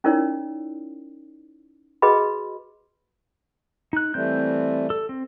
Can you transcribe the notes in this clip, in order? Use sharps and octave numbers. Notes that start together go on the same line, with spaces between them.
C#4 D#4 E4 A#4 C#5 D5
F#4 G#4 B4 D#5 B5
D#4 F#6
E3 G3 A3 C4 G6
A4
C4